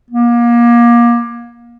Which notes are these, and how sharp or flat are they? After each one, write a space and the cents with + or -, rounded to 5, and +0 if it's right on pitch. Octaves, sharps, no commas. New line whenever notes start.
A#3 +30